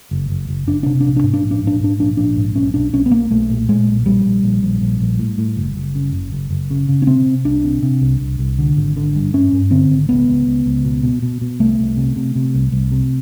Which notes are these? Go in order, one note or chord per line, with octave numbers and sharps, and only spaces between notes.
F#1
F#1
F#1
F#1 D4
C3 D4
D4
A#1
D4
G#2
D4
A#1
D4
G#2
D4
G#2 D4
A#1 D4
A#1 D4
G#2
B1 C#4
B1 D4
B1 C#4
B3
B1 A#3
B1 A3
A#2
A#2 G#3
B1
A#1 G3
A#1
A#1
A#1
A#1
A#1
A2
A2
F#1
F#1
C#3
F#1
F#1
F#1
C#3
C#3
C#4
C3 C4
C3
C2 D4
C3
C3
C2
C2
C2
D3
G#1
D3
G2
G2 C#4
G2
D3 C4
G#1
C#2 B3
C#2
C#2
C#2
B2
B2
B2
B2
C2 A3
C2
C3
C3
C3
C2
C2
C3